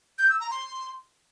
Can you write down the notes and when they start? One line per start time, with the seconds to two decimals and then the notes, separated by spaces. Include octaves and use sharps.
0.19 G6
0.29 E6
0.40 A#5
0.51 C6